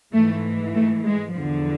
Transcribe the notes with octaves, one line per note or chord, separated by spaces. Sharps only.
G#2 E3 A3
A3
G#3
E2 D3 F3